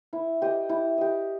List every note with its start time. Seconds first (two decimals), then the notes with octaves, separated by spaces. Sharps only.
0.13 E4
0.42 G4 D#5
0.69 E4
0.98 G4 D#5